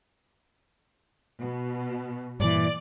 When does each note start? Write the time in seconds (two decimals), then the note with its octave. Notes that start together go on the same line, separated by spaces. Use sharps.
1.41 B2
2.40 G2 A#2 E3 D5